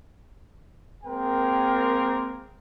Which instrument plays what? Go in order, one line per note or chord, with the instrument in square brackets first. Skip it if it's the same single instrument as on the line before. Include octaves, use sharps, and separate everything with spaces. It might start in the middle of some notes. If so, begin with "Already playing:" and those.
[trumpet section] G#3 A#3 C4 A#4 G5